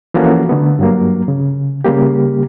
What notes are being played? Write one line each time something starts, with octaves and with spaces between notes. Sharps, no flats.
E3 F3 A#3 C#4 F#4 A4
D3 A3 B3
G2 F#3 A#3
C#3
C#3 G3 A#3 G4